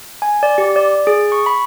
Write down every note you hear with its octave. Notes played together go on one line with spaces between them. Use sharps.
G#5
D5
G4
D5
G#4
C#6
B5